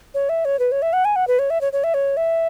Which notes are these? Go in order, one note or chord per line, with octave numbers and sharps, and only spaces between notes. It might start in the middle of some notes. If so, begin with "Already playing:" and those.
C#5
E5
C#5
B4
C#5
E5
F#5
G#5
F#5
B4
C#5
E5
C#5
C#5
E5
C#5
E5